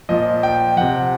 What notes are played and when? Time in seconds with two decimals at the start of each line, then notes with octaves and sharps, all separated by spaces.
0.09 A#2 F3 D#5
0.43 G5
0.77 C3 F3 F#5